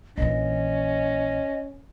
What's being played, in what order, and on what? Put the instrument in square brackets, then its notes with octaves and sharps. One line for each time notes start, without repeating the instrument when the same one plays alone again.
[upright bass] A#1 E3 [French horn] C#4 [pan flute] D#5